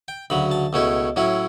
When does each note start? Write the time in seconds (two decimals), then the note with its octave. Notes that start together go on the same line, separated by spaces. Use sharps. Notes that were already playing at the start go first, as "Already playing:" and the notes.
0.08 G5
0.30 D2 C#3 F#3 B5
0.51 A5
0.73 C#2 B2 A3 C#4 E4
1.16 A2 F#3 C#4 E4